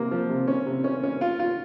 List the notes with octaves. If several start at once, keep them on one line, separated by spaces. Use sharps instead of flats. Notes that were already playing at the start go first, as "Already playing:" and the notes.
Already playing: C3 A#3
F3
C3
C#4
C3
C#4
C#4
F4
F4